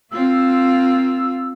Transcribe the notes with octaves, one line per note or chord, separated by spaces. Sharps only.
A#3 C4 F4 E6